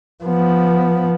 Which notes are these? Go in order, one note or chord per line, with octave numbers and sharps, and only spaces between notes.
F3 B3